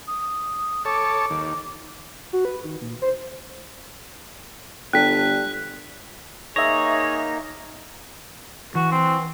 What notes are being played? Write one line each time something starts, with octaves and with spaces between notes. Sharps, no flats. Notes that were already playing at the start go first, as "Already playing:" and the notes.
D#6
A4 C#5 D6
D#2
F#4
B4
D#3
A#2
C5
G1 G3 A4 G5 F#6 B6
A#3 D#4 G#4 C#5 E5 A#6
E3 F#4
C4